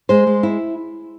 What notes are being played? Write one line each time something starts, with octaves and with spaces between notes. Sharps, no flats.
G#3 C5
G#3
E4